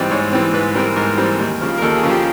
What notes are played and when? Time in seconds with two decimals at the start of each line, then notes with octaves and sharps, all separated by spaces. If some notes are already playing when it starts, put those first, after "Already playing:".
Already playing: G#2 E3 G3 C4 D5 D#5
0.11 G#2 C#5
0.32 E3 G3 C4
0.54 G#2 B4
0.75 E3 G3 C4 A#4
0.96 G#2 A#4
1.18 E3 G3 C4
1.40 D#2
1.61 C#3 F3
1.78 A#4
1.82 D#2 A4
1.96 G#4
2.03 C#3 F3
2.11 G4